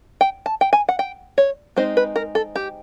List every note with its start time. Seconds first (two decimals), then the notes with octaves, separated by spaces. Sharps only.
0.21 G5
0.46 A5
0.61 G5
0.73 G#5
0.89 F#5
0.99 G5
1.38 C#5
1.76 G#3 C4 D#4 C5
1.97 B4
2.16 A#4
2.35 A4
2.56 G4